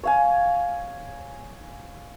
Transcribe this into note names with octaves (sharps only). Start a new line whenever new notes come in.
C#5 F5 G#5